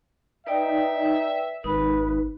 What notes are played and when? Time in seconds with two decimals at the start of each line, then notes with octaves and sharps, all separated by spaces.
0.47 D#4 B4 D5 E5 G5
1.64 G#1 D#4 B4